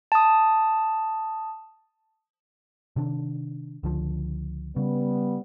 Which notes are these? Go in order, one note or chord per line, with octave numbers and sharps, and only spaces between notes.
A5 D#6
C3 D#3 D4
C#2 D3 F3
C#3 G3 B3